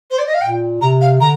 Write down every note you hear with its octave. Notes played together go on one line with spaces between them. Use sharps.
C5
D5
D#5
F5
A#2 G5
C3 A#5
F5
D3 A#5